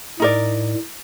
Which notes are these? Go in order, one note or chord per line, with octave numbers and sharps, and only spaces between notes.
A2 D#4 A#4 D5